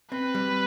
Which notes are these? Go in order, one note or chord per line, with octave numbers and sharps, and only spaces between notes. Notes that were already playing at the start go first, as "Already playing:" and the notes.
C4 B4
G3